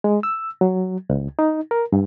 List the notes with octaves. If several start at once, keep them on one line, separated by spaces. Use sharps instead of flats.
G#3
E6
F#3
C#2
D#4
A#4
G2